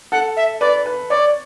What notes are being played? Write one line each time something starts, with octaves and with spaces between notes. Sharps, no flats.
A4 F#5
E5
B4 D5
B4
C#5 D5